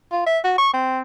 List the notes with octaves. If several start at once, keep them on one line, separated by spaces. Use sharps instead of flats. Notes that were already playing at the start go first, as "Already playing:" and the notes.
F4
E5
F#4
C#6
C4